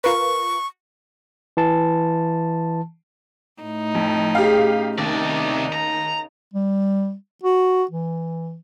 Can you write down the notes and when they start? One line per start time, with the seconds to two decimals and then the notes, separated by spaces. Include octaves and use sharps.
0.04 F4 A#4 B4 C#6
1.57 E3 A5
3.62 A2 D#4
3.95 F2
4.35 C#3 G4 F5
4.98 D#2 C3 D#4 D5
5.73 A#5
6.54 G3
7.43 F#4
7.91 E3